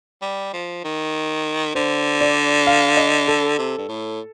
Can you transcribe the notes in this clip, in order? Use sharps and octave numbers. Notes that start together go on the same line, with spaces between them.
G3
F3
D#3
D3 C5
D5
F5
D#5
A4
C3
G2
A2